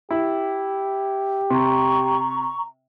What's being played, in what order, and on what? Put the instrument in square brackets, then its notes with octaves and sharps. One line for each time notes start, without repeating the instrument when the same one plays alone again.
[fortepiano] E4 [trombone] G4
[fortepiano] C3 [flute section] A#5 C#6